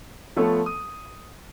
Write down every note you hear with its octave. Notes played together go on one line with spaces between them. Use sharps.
F3 A3 B3 A4 C#5
D#6